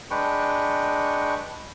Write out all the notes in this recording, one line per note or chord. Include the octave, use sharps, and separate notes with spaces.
G#3 D4 B4 G5 C#6